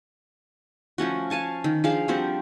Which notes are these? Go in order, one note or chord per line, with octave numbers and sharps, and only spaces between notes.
F3 A3 C#4 F#4
F5 G#5 A5 C#6
D#3
F3 D4 G#4 F5
F3 G3 C4 F#4